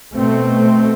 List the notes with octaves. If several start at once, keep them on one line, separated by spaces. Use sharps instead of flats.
B2 A3 C4